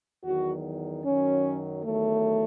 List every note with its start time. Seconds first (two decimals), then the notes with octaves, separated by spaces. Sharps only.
0.24 E2 D#3 F#3 F#4
1.04 F#2 D#3 F#3 C#4
1.85 E2 D#3 F#3 A3